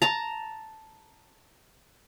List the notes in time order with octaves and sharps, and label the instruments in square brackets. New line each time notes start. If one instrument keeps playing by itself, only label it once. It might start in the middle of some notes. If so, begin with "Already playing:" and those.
[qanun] A5 A#5